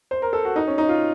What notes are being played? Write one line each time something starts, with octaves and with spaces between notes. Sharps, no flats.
C5
A#4
A4
F#4
D#4
C#4
D#4
F4